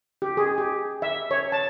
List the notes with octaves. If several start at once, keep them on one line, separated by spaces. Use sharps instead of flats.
G4
G#4
G4
E5
C#5
A5